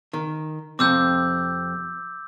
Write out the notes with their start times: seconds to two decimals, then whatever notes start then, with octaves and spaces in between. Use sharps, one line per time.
0.13 D#3
0.79 F2 C3 C4 D6 E6 G6